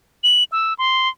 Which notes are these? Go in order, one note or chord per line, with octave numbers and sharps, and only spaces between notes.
F#7
E6
C6